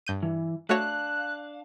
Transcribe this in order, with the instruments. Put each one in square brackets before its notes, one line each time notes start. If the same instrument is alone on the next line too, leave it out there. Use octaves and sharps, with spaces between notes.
[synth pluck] G2 G6 D#7
[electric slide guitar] E3
[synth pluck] A3 F#4 C#5 [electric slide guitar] D4 F5 [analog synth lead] F#6